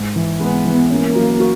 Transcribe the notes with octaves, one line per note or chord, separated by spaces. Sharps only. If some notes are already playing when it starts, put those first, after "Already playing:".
Already playing: G#2
E3
G#3 B3
E3
A#3 C#4
F#3
F#4